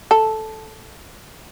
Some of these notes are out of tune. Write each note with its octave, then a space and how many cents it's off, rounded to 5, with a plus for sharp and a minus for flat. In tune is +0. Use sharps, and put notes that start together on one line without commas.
A4 -5